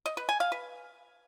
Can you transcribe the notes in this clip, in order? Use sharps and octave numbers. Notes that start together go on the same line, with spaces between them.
D#5
B4
G#5
F5
B4